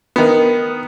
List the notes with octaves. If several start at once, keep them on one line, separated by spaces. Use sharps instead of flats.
D#3 B3